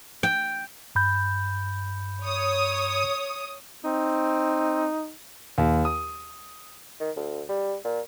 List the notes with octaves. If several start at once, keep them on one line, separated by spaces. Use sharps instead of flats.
G5
G2 B5 G6
C#5 D#6
C4 D#4
D#2
D#6
D#3
D2
G3
A#2